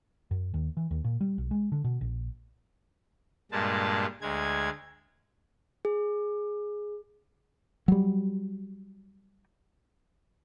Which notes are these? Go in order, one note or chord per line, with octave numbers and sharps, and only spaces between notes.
F#2
D#2
E3
D#2
A#2
G3
B1
G#3
D3
B2
A#1
G2 A#2 G#3 A5
D2 G#3 G#6
G#4
F#3 G3